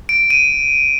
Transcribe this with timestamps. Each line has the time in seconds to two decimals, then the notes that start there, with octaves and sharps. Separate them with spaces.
0.09 D7
0.30 D#7